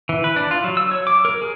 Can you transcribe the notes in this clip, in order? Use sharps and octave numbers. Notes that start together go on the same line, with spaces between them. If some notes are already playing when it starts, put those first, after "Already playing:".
E3
B4
D4
F4
F#3
E6
C#5
D6
A#4
G#4